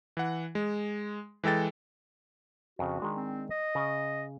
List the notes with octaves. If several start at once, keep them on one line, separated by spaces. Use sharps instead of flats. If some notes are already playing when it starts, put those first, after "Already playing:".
E3 F#5
G#3
E3 G#3 A4 G5 A6
F2 C#3 F#4
D#3 G#3 D4
C4
D#5
C#3